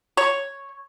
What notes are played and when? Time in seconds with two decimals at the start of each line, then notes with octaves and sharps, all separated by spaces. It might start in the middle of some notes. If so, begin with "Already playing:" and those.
0.17 C#5